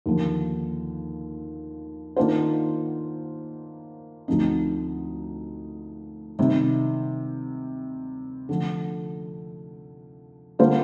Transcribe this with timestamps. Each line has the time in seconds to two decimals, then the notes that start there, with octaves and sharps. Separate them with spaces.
0.06 D#2 D3 F3
2.17 D#3 A#3 D4 F4 C5
4.28 D2 D3 F3 C4 D#4
6.39 C3 D#3 G3 C4
8.49 D3 F3 A3
10.59 D3 G3 A#3 F4 C5